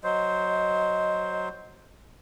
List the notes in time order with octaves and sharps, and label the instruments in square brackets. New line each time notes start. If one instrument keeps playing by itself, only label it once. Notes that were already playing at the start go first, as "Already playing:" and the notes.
[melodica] F#3 C5 [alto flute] D#5